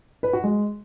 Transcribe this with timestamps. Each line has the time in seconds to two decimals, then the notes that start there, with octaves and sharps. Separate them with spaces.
0.23 B4
0.33 F#4
0.44 G#3